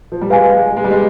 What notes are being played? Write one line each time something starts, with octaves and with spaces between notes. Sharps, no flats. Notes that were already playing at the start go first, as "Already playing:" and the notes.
F3
G3
G#3 B4 F5 G#5
G#3
G#3
G3
G#3